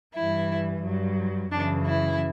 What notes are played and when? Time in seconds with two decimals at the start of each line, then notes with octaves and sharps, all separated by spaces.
0.16 G2 E3 E4
0.84 G2 F#3
1.52 F#2 C#3 E3 D4
1.86 E4